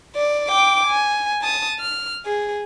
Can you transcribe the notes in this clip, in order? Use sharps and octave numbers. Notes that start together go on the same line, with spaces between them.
D5
G5 D6
G#5
A5 D#6
F6
G#4